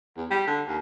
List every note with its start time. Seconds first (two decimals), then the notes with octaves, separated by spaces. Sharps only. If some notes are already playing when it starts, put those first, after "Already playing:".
0.17 E2
0.30 G3
0.47 D3
0.67 D#2